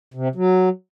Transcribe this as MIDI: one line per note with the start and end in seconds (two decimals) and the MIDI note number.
0.14 0.28 48
0.36 0.69 54